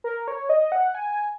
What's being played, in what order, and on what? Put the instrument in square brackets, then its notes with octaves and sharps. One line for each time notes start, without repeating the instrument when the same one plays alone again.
[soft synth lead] A#4
C#5
D#5
F#5
G#5